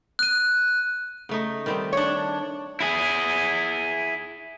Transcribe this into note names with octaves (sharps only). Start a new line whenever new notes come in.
F#6 D#7
C#3 A3 D#4
D#3 G3 C4
D4 C#5
E4 G#4